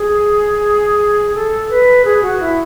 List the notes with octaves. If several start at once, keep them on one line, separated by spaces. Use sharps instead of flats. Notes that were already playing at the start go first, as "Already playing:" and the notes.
Already playing: G#4
A4
B4
G#4
F#4
E4